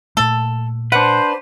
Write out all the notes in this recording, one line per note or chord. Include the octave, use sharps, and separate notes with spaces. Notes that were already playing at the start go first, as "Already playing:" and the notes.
A#2 A3 A4
D4 B4 C5 F#5